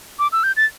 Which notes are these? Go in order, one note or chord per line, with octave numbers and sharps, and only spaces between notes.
D6
E6
G6
A6